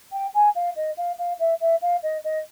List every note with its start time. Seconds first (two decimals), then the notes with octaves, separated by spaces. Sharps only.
0.12 G5
0.34 G#5
0.55 F5
0.76 D#5
0.97 F5
1.19 F5
1.39 E5
1.61 E5
1.82 F5
2.03 D#5
2.24 D#5